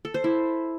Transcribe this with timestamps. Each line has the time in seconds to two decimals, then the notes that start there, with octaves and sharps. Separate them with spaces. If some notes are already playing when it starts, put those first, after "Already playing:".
0.05 A4
0.14 C5
0.24 E4